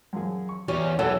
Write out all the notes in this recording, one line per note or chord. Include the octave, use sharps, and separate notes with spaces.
F#2 F3 G#4
C#6
E2 C#4 G4 D5
B1 E2 E3 F#3 G#4 A4